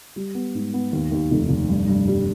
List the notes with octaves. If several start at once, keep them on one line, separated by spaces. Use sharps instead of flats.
G3
B3
G#2
B3
D#2
D#2
F1
F1
G2
G2
G3